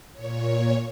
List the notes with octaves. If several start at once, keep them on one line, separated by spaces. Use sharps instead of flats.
A#2 C#5